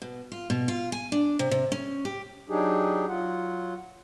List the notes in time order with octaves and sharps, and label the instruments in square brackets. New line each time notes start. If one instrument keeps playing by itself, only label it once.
[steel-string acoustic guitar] B2
F4
B2
F4
G#5
D4
C3
C3
C#4
G4
[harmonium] F#3 D4 D#4 G4 G#4
F#3 F4 F#5